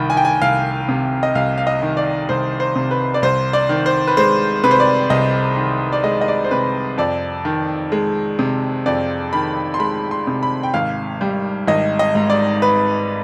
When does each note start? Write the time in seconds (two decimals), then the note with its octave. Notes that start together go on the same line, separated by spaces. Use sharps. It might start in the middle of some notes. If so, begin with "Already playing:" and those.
Already playing: C2 D#3 B5
0.10 G#5
0.17 G5
0.25 G#5
0.41 C2 F5
0.89 C3
1.23 D#5
1.35 C2 F5
1.58 F5
1.67 D#5
1.82 D#3
1.97 D5
2.29 C2 C5
2.60 C5
2.76 C3
2.91 B4
3.14 D5
3.22 C2 C5
3.53 D5
3.69 D#3
3.86 C5
4.07 B4
4.17 G#3 C5
4.64 C3 B4
4.71 C5
4.80 D5
5.10 C2 D#5
5.57 D#3
5.92 D5
6.04 G#3 D#5
6.21 D#5
6.28 D5
6.44 C5
6.51 C3 B4
6.98 F2 D5
7.45 D#3
7.92 G#3
8.39 C3
8.86 F2 D5
9.33 D#3 B5
9.74 C6
9.79 G#3 B5
10.11 C6
10.27 C3
10.43 B5
10.63 G5
10.74 G#1 F5
11.21 G3
11.68 G#1 D#5
11.99 D#5
12.15 G#2
12.30 D5
12.62 B4